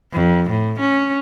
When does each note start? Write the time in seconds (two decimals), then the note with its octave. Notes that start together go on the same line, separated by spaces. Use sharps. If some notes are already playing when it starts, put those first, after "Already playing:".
0.13 F2
0.50 A2
0.80 C#4